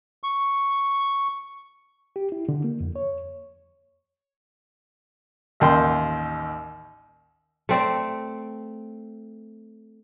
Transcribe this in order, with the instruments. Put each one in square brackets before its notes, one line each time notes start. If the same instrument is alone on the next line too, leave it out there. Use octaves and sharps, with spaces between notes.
[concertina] C#6
[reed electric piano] G4
E4
D3
A#3
F2
C#5
[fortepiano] A1 D#2 G5 C6
[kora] A3 C4 D5